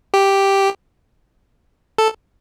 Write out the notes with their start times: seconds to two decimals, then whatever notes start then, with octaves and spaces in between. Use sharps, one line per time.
0.14 G4
1.98 A4